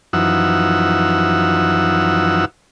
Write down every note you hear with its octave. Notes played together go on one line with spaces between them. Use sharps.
F#2 E3 F3 D#4 F#5 E6